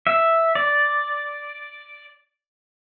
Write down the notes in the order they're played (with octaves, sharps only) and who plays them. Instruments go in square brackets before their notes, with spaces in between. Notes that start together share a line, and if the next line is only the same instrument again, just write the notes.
[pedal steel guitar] E5
D5